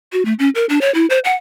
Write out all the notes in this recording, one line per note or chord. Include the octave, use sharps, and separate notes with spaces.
F#4
A3
C#4
A#4
D4
C#5
E4
C5
F#5